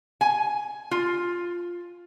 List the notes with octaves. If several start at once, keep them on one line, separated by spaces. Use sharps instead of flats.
G#5
F4